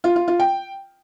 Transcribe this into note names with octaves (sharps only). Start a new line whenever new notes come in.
F4
F4
F4
G5